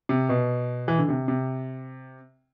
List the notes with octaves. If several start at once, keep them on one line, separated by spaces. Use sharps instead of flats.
C3
B2
E3
D3
C3
C3